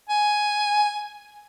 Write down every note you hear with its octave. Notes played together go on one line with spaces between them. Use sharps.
G#5